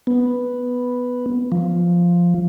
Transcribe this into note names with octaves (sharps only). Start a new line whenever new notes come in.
B3
F3